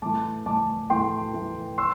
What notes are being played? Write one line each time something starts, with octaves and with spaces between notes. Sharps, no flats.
A2 E3 A3 A5 D6
A2 E3 A3 A5 D6
A2 E3 A3 G5 C6
A2 E3 A3
C6 E6